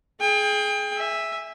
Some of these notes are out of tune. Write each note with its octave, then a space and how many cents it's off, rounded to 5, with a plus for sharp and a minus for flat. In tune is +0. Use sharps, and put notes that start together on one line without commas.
G#4 +20 G5 +35
E5 +0 G#5 -15